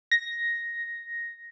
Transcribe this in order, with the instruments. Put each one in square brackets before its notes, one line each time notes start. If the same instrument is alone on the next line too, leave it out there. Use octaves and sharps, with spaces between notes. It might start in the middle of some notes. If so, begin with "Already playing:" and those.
[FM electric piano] A#6